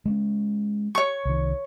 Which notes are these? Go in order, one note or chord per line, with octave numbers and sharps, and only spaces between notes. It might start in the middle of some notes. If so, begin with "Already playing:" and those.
G#3 A#3 C#4
C#5 C#6
C2 D#3